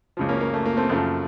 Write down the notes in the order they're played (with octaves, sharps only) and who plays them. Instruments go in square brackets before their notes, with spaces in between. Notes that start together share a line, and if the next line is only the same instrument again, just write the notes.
[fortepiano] C#2 C#3 F3
A#3 C#4
A#3
A3
A#3
A3 C4
F#2 C#3 F3 A3